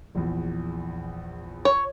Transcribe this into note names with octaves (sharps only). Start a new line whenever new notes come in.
A#1 E2
C#5